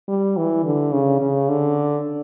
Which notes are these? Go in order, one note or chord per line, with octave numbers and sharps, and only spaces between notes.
G3
E3
D3
C#3
C#3
D3